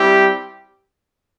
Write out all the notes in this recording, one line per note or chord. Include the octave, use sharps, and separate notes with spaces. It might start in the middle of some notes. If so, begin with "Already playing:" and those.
Already playing: G3 C4 E4 G4